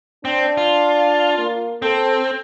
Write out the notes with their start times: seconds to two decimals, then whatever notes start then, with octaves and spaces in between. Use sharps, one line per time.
0.25 C4 D4
0.57 F4
1.38 A#3
1.82 C4 A4